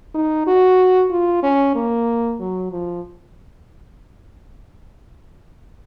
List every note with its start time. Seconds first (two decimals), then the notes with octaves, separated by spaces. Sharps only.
0.14 D#4
0.47 F#4
1.10 F4
1.42 C#4
1.75 A#3
2.40 F#3
2.71 F3